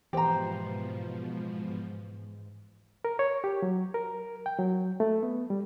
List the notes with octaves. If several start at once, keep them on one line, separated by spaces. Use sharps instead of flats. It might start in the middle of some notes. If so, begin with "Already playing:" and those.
G#2 B2 E3 F3 G4 C5 A#5
A#4
C#5
G4
F#3
A#4
G5
F#3
A3
B3
G3